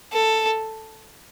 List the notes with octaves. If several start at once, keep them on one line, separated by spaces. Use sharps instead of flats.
A4